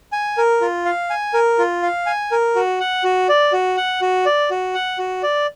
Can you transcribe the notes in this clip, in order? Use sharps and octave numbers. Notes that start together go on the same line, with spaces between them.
G#5
A#4
F4
F5
G#5
A#4
F4
F5
G#5
A#4
F#4
F#5
F#4
D5
F#4
F#5
F#4
D5
F#4
F#5
F#4
D5